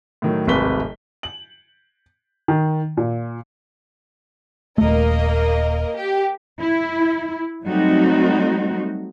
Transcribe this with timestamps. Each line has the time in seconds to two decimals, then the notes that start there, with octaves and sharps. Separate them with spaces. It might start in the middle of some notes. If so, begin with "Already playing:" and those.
0.22 A2 D#3 F#3
0.47 D1 G#1 C3 B4 B6 G7
1.23 F#7
2.48 D#3
2.97 A#2
4.78 D#1 A3 A#3 A#4 D#5
5.96 G4
6.59 E4
7.65 F#3 G3 A3 C4 D#4 F#4